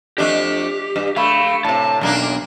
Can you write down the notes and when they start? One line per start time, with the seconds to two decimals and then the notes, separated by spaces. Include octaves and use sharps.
0.18 F2 A3 D4 G4
0.96 G2
1.16 A3 F5 B5
1.65 A2 C3 A5
2.01 B1 F#2 A#3 D4